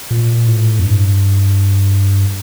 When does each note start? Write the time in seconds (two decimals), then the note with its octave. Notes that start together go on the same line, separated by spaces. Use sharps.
0.11 A#2
0.47 A2
0.79 F2
0.84 G2